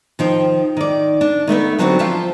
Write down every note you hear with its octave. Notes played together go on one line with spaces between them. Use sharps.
D#3 F3 G5
D#3 D5
D4
D#3 A3 B3 E5
D3 F#3 G3 C4 F4 F#4
F3 F4 E5 G5 A5